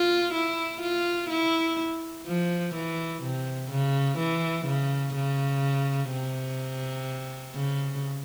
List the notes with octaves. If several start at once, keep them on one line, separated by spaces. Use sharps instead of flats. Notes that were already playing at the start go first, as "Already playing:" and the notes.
Already playing: F4
E4
F4
E4
F3
E3
C3
C#3
E3
C#3
C#3
C3
C#3